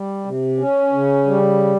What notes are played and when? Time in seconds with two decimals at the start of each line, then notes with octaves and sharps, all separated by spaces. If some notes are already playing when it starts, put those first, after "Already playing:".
Already playing: G3
0.25 C3
0.59 C#4
0.93 C#3
1.26 G3